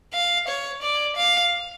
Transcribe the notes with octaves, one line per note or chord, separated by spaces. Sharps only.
F5
C#5
D5
F5